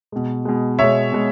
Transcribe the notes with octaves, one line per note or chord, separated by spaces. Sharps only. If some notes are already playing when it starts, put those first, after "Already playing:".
B2 G#3
B2 G#3
B2 G#3 C#5 E5
B2 G#3